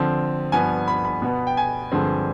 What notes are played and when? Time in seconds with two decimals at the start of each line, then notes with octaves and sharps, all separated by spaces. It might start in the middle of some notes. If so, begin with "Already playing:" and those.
Already playing: D3 F3 C4
0.52 G2 F3 B3 G#5
0.88 B5
1.05 B5
1.22 B2 B3
1.47 G5
1.57 G#5
1.92 G2 D3 F3 G#3 C4